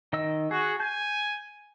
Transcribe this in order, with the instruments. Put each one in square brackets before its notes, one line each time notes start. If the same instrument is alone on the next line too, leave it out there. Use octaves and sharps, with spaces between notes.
[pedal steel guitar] D#3 D#5 E6
[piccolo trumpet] F#4 [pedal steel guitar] G#4
[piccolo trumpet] G#5 [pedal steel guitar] G6